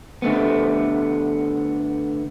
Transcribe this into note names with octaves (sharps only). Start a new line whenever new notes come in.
D3 A3 B3